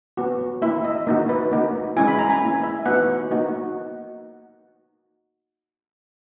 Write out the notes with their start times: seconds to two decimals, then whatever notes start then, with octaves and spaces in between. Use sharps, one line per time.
0.17 B3 F#4
0.62 A#3 E4 E5
0.84 D#5
1.07 A#3 D#4 F#4
1.29 B4
1.52 A#3 D#4 F#4
1.97 G#3 C#4 E4 G#5
2.08 B5
2.19 A#5
2.30 G#5
2.42 A#3 E4
2.64 E5
2.86 B3 D#4 F#4 F#5
3.31 A#3 D#4 F#4